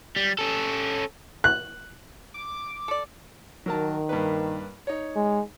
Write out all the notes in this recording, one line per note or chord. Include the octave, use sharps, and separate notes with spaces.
G3
C#4 A4
F#6
D6
A4 D5
D#3 F#3 A#4 A5
G2 A#3 B4
D#4 C#5
G#3